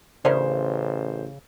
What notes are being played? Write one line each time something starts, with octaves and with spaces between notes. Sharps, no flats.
A1 C#3 D4 E4 A#4 C5